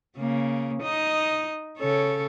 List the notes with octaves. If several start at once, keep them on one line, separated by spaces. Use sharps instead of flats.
C#3 A#3
D#4 D#5
C#3 A4 C#5